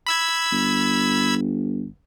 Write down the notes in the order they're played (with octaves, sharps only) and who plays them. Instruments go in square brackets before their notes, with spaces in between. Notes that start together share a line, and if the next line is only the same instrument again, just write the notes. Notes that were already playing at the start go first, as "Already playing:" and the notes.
[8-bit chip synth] B5 E6 G#6
[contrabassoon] G1